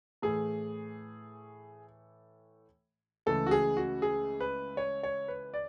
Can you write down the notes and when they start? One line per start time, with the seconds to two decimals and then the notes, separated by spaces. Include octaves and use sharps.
0.22 A2 E3 A3 G#4
3.26 C#2 C#3 E3 A3 A4
3.46 F#4
3.51 G#4
3.77 F#4
4.02 G#4
4.40 B4
4.77 C#5
5.03 C#5
5.28 B4
5.54 D5